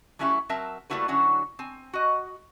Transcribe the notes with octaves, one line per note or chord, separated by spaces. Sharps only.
F#3 A3 C#4 E4 G4 E5
F#3 C4 A#4 E5 A5
G3 A3 A#3 E4 F#4 B4
D3 F#3 C#4 E4 F#4
C4 G#5
F#4 D#5